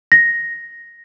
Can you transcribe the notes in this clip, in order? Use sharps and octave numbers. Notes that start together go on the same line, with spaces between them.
A#6